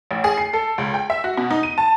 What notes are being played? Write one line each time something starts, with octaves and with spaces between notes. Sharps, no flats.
A1
G#4
C7
A4
C#2
G5
E5
F#4
B2
D#4
D#7
A5